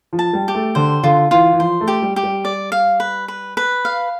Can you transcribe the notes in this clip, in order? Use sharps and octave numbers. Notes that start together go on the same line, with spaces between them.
F3
A5
G3
G4
A3
D3 C5
D3 F4
E3 F4
E3
F3 C5
A3
G4
G3
G4
G3
D5
F5
B4
B4
B4
F5